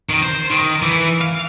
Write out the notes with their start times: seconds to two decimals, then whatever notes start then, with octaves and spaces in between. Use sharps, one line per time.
0.10 D#3
0.22 C5
0.50 D#3
0.82 E3
1.21 F5